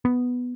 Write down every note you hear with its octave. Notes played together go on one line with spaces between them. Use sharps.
B3